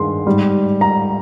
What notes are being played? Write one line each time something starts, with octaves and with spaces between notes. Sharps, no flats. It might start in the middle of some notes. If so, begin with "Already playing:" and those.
Already playing: G2 D#3 G#3 C6
G#2 G3
A#5